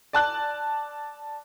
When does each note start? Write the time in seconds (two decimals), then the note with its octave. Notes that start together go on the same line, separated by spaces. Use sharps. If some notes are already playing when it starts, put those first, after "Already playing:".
0.13 D5 A5 F#6